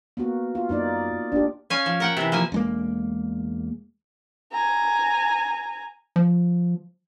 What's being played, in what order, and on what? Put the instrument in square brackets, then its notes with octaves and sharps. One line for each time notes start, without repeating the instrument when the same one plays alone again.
[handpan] A#3 B3 F#4
F4
[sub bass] F#2 [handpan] A#3 D#4 D5
[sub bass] F1 [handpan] D4 G4
[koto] C#4 C#5 F5 G#5
F3
A#4 F#5 G5
C3 E3
F3 A#3 G#5
[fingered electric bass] E1 G#3 A#3
[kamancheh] G#5 A#5
[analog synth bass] F3